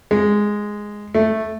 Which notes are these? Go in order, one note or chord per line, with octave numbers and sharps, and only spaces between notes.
G#3
A3